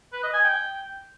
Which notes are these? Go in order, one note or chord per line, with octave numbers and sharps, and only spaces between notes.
B4
D#5
G#5
G5